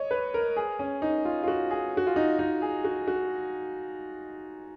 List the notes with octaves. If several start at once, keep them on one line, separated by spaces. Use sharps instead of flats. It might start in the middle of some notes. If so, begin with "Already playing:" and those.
Already playing: C#5 D#5
B4
A#4
G#4
C#4
D#4
F4
F4
F#4
G#4
F#4
F4
D#4
D#4
G#4
F#4
F#4